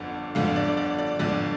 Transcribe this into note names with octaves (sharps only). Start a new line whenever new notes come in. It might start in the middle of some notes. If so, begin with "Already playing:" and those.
Already playing: G1 F2 D3
G1 F2 D3 F5
D5
D5
D5
G1 F2 D3 D5